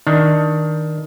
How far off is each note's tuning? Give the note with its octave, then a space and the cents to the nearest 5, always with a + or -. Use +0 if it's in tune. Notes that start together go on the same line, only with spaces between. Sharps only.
D#3 +10 D4 +15